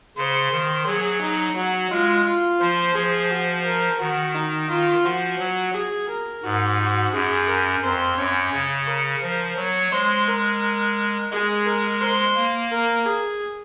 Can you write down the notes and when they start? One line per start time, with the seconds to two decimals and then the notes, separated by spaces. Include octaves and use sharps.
0.16 C#3 C5
0.52 D#3
0.86 F#3 G#4
1.21 D#4
1.56 F#3 F#4
1.91 G#3 F4
2.26 F4
2.60 F3 C5
2.95 F3 G#4
3.30 F#4
3.65 A#4
4.00 D#3 F#4
4.35 D#4
4.70 F4
5.04 F3 F#4
5.39 F#3
5.74 G#4
6.09 A#4
6.44 G#2 F#4
6.79 F#4
7.13 F#2 G#4
7.48 A#4
7.83 F2 C5
8.18 F#2 C#5
8.53 C#3
8.87 A#4
9.22 F3
9.57 F#3 C#5
9.92 G#3 C5
10.27 A#4
11.31 G#3 G#4
11.66 A#4
12.01 C5
12.36 A#3
12.71 A#4
13.06 G#4